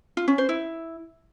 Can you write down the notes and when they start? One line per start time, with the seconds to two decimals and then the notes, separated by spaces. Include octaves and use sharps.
0.17 F4
0.28 C#4
0.38 C5
0.49 E4